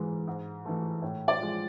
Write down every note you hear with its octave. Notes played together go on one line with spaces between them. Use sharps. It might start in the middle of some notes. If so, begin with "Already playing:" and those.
Already playing: G#2 E3 G#3
G#2
E3 A3
A2
D5
F3 G#3